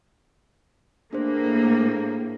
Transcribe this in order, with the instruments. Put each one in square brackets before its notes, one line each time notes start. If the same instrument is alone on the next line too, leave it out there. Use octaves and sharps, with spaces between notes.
[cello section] A2 A#3 [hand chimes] D4 G#4 C5